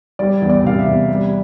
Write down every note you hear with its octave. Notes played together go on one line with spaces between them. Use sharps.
G3 D5
E2
D5
C3 F5
E5
E2
G3